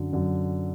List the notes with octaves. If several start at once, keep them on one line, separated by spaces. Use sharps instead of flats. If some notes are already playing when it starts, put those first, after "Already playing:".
Already playing: F#2 D3 F#3
F#2 D3 F#3